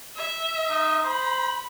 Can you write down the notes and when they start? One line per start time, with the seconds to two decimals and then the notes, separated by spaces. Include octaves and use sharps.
0.17 E5
0.69 D#4
1.04 C5 B5